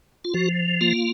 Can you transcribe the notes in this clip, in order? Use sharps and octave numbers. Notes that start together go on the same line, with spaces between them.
F4
F3 F#4
A#3 F4